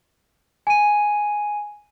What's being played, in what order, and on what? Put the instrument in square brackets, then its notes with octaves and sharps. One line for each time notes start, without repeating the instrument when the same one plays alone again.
[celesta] G#5 D#7